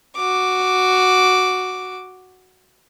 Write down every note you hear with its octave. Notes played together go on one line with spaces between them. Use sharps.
F#4 D6